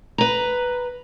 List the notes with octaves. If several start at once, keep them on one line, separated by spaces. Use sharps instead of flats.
B4 A#5